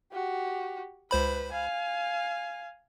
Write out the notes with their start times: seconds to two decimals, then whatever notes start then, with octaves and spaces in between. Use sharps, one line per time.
0.12 F#4 G4
1.11 C#2 B4 C5 B5
1.52 F5 G#5